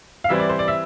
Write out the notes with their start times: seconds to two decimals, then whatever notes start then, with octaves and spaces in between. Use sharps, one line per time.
0.24 F5
0.29 E3 G3 C4 E4 E5
0.40 D5
0.49 C5
0.59 D5
0.68 E5